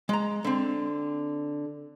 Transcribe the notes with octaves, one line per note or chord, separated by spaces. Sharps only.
G#3 A#5
D3 C4